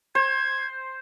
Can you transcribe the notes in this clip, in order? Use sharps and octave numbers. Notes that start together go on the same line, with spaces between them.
C5 G#6